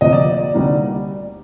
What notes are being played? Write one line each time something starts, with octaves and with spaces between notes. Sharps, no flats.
D2 C3 F3 A#3 D#5
D5
D5
D2 C3 G3 A#3 D#4